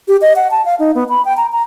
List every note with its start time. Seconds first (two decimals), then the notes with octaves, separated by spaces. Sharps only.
0.08 G4
0.21 D#5
0.36 F#5
0.51 A5
0.65 F5
0.79 D#4
0.95 B3
1.09 B5
1.25 G5
1.37 A#5
1.52 A#5